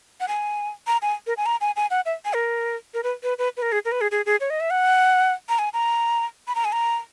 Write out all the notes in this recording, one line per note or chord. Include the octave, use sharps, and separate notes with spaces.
F#5
G#5
A#5
G#5
A#4
G#5
A#5
G#5
G#5
F#5
E5
G#5
A#4
A#4
B4
B4
B4
B4
A#4
G#4
A#4
B4
G#4
G#4
G#4
C#5
D#5
E5
F#5
A#5
G#5
A#5
B5
A#5
G#5
A#5